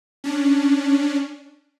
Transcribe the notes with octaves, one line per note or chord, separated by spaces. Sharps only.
C#4 D4